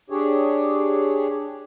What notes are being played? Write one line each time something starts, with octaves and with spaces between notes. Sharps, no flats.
D4 G4 G#4 C#5